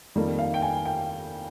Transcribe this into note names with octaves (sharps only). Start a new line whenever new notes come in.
F2 D#3 G3 A#3 D#4
F5
G5
G#5
G5